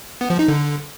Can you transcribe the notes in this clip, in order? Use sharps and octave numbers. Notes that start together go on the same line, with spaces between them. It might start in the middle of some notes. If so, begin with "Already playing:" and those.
B3
F3
D#4
D3